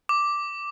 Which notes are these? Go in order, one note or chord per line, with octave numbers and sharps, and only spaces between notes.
D6